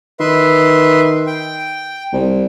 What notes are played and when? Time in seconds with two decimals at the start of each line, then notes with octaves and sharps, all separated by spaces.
0.20 D#3 B4 E5 C6
1.27 G5
2.13 C2